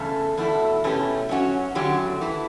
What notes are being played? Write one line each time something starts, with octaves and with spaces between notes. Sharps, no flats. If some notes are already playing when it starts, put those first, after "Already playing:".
Already playing: E2 C#3 A3
E2 B2 A3 E4
B2 A3 C#4 G4 B4
F#3 C#4 F#4
E2 D3 F#3 C#4 G4
E3 A3 E4